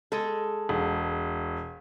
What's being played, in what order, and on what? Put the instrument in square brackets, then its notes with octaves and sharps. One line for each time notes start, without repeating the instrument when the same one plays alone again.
[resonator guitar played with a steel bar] G#3 A4
[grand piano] E1